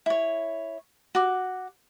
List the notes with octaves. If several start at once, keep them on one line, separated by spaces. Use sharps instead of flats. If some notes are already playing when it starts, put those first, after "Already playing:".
E4 C#5
F#4 D6